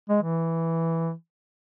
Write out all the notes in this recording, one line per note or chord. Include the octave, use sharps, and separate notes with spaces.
G#3
E3